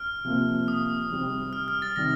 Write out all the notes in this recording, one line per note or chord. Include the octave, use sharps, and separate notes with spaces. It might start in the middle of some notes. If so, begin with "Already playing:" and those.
Already playing: F6
C3 F3 A#3
D#6
C3 G3 C4
F6
F6
A6
C3 D#3 G3 D4 A#6